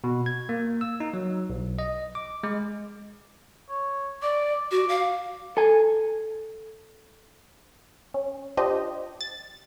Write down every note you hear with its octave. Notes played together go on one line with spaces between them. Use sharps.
B2
G#6
A#3
E6
D#4
F#3
B1
D#5
D6
G#3
C#5
D5 D6
F#4 D6
F5
A4 G#5
C#4
D4 F4 G4 C5 D#5
A6